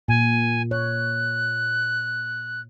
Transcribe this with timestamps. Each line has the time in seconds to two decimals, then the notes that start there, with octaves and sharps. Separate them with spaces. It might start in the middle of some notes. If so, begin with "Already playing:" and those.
0.08 A#2 G#5
0.71 C#5 F#6